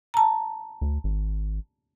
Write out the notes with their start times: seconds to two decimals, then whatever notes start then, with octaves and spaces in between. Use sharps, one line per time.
0.14 A5 A#5
0.81 D2
1.04 G#1